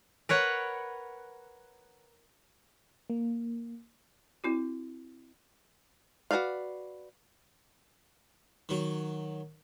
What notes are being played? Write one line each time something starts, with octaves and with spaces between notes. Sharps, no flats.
A#4 B4 C#5 F#5
A#3
C4 E4 F#4
F#4 A4 B4 D5 F5
D#3 F#3